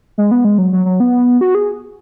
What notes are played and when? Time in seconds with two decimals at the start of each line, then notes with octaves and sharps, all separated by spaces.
0.18 G#3
0.31 B3
0.45 G#3
0.58 F#3
0.73 F#3
0.86 F#3
1.00 B3
1.41 F#4
1.55 G#4